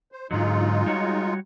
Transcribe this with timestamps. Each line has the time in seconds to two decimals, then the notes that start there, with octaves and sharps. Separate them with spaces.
0.12 C5
0.31 G#2 D3 F#3 G#3 D#4 F4
0.86 G3 F#4 C#5